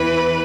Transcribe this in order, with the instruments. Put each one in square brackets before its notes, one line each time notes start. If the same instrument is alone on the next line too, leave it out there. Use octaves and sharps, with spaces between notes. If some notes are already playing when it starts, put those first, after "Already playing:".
Already playing: [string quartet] E2 E3 B4